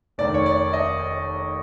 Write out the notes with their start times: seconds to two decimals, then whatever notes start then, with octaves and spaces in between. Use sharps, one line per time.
0.18 F1 D#2 D#3 D5
0.34 C#5
0.46 D5
0.73 D#5